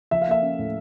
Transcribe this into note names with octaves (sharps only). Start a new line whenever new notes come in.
F3 E5
F5
A#3 E5
C#4
A2